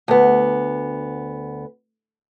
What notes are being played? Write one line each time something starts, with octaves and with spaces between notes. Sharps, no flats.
D2 B3